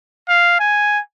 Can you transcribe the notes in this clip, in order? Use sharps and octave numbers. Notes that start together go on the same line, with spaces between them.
F5
G#5